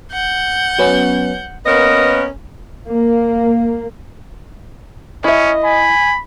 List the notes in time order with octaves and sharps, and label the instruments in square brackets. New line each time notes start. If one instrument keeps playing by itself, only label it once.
[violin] F#5 G6
[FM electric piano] F#3 B3 C#4
[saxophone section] A#3 B3 C#4 A#4 B4 D#5
[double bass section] A#3
[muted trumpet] C#4 [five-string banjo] E4 E5 [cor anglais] D#5
[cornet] G#5 [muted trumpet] B5